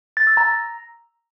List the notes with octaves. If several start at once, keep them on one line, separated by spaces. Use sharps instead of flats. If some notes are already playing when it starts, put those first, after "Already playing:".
A6
E6
A#5